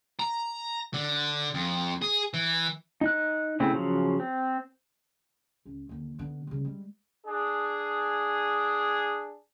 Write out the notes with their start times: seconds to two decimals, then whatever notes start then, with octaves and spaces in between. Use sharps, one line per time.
0.19 A#5
0.94 D3
1.54 F2
2.02 G#4
2.34 E3
3.01 D#4 F#6
3.60 C#3 A3 C4 E4
3.73 C#3 F3 F#3
4.20 C4
5.66 C#2
5.89 D#2 D3
6.19 D3 B3
6.47 C#3 G3
6.65 G3 G#3
7.26 D4 G#4